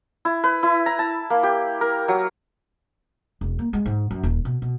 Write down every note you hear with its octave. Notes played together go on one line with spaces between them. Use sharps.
E4
B4
E4
A#5
A5
A#3
G4
A#4
F#3
E1
A#3
G#3
G#2
F#2
D#1
B2
B2